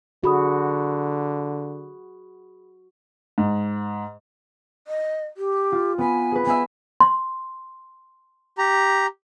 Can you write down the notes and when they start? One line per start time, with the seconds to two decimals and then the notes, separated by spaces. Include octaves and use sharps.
0.24 D3 F#4 G#4 B5 D#6
3.38 G#2
4.88 D#5
5.37 G4
5.72 F4
5.98 B3 B4 G#5
6.32 G#4 B4
6.46 B3 E5 G#5
7.00 C6
8.58 G4 A#5